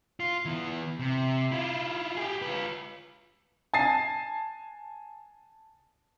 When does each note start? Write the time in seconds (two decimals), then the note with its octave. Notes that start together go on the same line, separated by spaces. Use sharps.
0.20 F4
0.45 E3 B3
1.00 C3
1.52 E4 F4
2.17 G4 G#4
2.42 F4 B4
3.74 G#5 A5 A6 C7